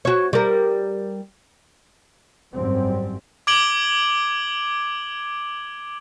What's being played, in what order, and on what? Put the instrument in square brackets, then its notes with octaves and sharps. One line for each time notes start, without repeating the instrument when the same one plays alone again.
[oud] F#4 C#5
G3 A#4
[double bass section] G#1 F#2 G3 C4
[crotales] D6 G#6 D7 F#7 G7